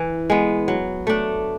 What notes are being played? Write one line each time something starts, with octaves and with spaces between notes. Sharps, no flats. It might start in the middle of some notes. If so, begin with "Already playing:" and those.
Already playing: E3
G#3 B3
F#3
A3 D4